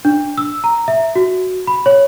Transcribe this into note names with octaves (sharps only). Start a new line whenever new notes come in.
D4
E6
A#5
E5
F#4
B5
C#5